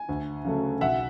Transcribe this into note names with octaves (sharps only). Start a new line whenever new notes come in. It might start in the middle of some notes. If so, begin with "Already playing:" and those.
Already playing: G#5
D2
C#3 F#3 A3
B1 E5 F#5